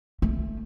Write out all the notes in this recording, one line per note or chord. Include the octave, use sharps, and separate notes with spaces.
A3